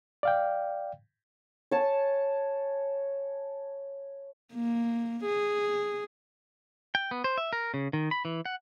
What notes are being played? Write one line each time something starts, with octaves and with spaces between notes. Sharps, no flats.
D5 F5 G5
C#5 G#5 A5
A#3
G#4
G5
B3
C5
E5
A#4
C#3
D#3
B5
E3
F#5